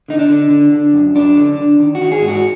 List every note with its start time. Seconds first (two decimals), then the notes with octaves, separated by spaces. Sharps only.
0.08 D3 D#4
0.19 D4
0.29 D3
0.51 D3
0.72 D3
0.93 F#2
1.15 F#2 D4
1.37 D3
1.58 D3
1.79 D#3
1.95 F#4
2.01 D#3
2.12 G#4
2.22 G#2
2.28 F#4